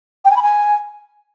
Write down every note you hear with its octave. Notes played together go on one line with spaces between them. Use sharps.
G5
G#5
B5
G#5